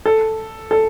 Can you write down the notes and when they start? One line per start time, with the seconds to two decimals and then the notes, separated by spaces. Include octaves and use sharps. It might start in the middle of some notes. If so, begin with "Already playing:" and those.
0.05 A4
0.71 A4